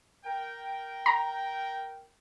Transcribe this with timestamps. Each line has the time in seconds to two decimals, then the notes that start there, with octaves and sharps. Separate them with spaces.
0.25 A#4 G5
1.06 A#5